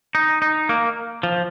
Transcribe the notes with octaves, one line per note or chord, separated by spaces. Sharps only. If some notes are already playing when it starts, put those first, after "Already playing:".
D#4
D#4
A#3
F3